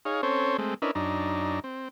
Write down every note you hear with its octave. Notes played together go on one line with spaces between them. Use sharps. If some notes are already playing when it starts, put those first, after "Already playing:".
D#4 G#4 C#5 F5
C4 C#4 A4 C5 C#5
G#3 A3 C4
C#4 D4 E4 A#4 B4 D#5
F#2 D4 D#4 A#5
C4